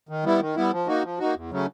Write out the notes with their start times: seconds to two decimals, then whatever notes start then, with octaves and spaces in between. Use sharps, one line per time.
0.09 D#3
0.25 G3 B3 E4
0.40 D#3
0.56 G3 B3 E4
0.72 F3
0.87 A#3 D#4 F#4
1.03 F3
1.19 A#3 D#4 F#4
1.35 E2
1.50 C#3 F#3 A3 C#4